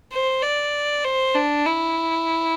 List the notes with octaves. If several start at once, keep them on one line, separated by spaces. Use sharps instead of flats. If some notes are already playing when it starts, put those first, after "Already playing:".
C5
D5
C5
D4
E4